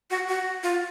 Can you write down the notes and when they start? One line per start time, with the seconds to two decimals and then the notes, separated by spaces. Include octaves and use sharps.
0.10 F#4
0.29 F#4
0.63 F4